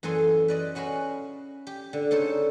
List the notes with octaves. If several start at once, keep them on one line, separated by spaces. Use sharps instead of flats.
F#2 E3 G#4 A4 G#5 C6
B4 D5 D#5
C#4 F#4 B4 F5 B5
G4
D3
C#3 D#4 A4 C5 C#5